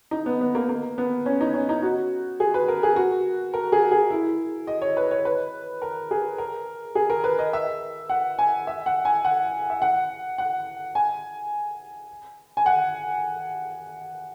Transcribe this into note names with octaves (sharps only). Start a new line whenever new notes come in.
D#4
B3
B3
A#3
A#3
B3
C#4
D#4
C#4
D#4
F#4
G#4
B4
A#4
G#4
F#4
A#4
G#4
G#4
E4
D#5
C#5
B4
C#5
B4
A#4
G#4
A#4
G#4
A#4
B4
D#5
E5
F#5
G#5
E5
F#5
G#5
F#5
E5
F#5
F#5
G#5
G#5
F#5